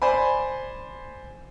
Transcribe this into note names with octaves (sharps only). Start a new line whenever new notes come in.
C5 D5 G#5 B5